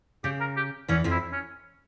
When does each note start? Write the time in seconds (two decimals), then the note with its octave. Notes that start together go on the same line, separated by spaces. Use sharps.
0.24 C#3 G4
0.40 A#4
0.57 G4
0.88 E2 E3 C#4
1.04 F2 F3
1.11 E4
1.32 C#4